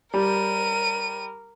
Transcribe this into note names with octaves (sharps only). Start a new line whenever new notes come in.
G3 A#4 D#7